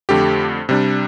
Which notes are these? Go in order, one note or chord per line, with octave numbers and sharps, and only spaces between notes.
F2 D3 A3 G4
C3 G3 D4